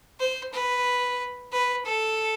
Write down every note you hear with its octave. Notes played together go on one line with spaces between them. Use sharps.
C5
B4
B4
A4